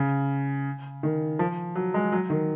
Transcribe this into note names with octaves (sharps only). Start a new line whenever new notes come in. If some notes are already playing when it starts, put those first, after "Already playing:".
Already playing: C#3
D#3
F3
F#3
G#3
F#3
D#3